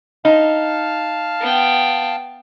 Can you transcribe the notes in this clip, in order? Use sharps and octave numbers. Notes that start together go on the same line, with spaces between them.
D#4 F5 A5 F6
B3 G5